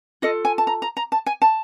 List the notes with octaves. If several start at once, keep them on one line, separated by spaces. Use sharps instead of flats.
F4 A4 D#5
G#5
A5
A#5
A#5
A#5
A5
G#5
A5